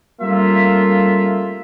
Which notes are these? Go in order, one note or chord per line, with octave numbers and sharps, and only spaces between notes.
G3 A3 A#3 C#4 F4 E5